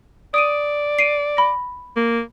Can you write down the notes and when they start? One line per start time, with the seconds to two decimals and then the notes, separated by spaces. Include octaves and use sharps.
0.34 D5 D#6 D7 D#7
0.99 C7 D7 D#7
1.37 B5 A#6
1.96 A#3